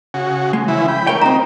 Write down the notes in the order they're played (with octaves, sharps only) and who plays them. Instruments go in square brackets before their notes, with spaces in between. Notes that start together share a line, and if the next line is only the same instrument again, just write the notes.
[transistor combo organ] C#3 F#4
[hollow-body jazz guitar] G#3
[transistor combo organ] C#3 E3 E4
G5 B5
[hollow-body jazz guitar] A#4 G5 [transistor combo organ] C#5
[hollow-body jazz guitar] C#2 C4 [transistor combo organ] D#4 [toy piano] A#5